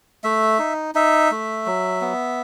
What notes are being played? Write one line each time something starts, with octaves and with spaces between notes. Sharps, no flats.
A3 E5
D#4
D#4 E5
A3
F#3
B3